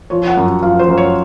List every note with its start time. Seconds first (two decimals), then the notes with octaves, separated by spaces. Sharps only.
0.10 F3 C#5
0.27 F#5
0.37 F#2
0.63 F3 F5
0.79 C5
0.88 F#2
0.98 C#5